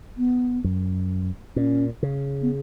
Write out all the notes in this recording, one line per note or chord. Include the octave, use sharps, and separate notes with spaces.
B3
F#2
A#2 C#4
C#3
B3